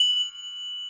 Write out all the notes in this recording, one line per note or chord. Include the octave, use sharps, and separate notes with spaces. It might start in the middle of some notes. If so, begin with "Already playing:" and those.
Already playing: F#7